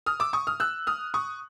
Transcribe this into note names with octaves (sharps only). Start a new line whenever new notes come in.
D#6 F6
D6 E6
C#6 D#6
D#6 F6
E6 F#6
D#6 F6
C#6 D#6